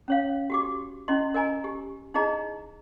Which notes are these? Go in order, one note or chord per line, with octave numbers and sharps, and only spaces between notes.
C#4 C#5 F5
F#4 G4 D6
C#4 E4 D#5 C6
A#4 D#5 G#5 A#5
G4
D#4 E4 G#4 D#5 A#5